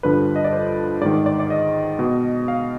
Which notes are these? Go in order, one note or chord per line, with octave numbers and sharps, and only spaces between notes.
G2 D3 F3 B4
D#5
D5
C5
G#2 D#3 D5
D5
D5
D5
D#5
B2
F5